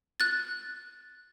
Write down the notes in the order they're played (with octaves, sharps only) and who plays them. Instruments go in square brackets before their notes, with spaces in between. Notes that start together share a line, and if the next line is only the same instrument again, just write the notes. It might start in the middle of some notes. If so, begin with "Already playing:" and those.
[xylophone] F#6 A6